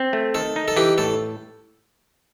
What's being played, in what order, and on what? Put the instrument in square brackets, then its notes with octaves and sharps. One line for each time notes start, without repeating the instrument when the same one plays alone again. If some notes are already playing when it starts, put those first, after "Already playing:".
Already playing: [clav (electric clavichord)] C4
A3
[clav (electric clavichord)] D#3 [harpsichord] A4
[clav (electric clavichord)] D#4
[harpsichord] A4
[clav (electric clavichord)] E3 [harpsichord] G4
[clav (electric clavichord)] A2 [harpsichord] A4